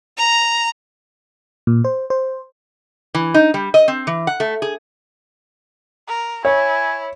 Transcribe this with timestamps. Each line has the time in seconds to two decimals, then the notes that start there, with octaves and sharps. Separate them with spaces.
0.17 A#5
1.67 A#2
1.85 C5
2.10 C5
3.14 E3
3.34 D#4
3.54 G3
3.74 D#5
3.88 C4
4.07 E3
4.27 F#5
4.40 A3
4.62 G#4
6.08 A#4
6.45 E4 C#5 G#5